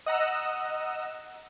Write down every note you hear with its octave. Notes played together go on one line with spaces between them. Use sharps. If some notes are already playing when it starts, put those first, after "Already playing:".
D#5 F#5 A#5 E6